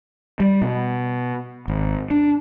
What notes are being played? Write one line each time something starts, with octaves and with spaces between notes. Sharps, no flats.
G3
B2
G#1
D4